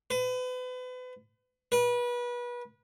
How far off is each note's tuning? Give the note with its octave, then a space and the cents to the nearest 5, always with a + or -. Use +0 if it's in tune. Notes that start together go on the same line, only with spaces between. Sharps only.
B4 +35
B4 -30